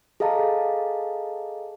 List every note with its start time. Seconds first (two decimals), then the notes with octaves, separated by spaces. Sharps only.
0.20 G#4 A4 D#5 F5 A5 A#5